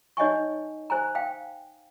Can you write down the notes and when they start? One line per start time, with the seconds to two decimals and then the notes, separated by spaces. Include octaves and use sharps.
0.17 D#4 C#5 D#5 F#5 G#5 C#6
0.90 C5 G#5 A#5
1.15 F5 G5